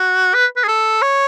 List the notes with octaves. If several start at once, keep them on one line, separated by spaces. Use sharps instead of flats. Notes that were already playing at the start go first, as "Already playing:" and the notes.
Already playing: F#4
B4
B4
G#4
A4
C#5